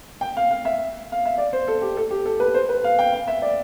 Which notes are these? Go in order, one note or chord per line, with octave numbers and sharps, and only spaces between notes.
G5
F5
F5
E5
F5
E5
D5
C5
A4
G4
A4
G4
A4
B4
C5
B4
F5
G5
F5
E5
D5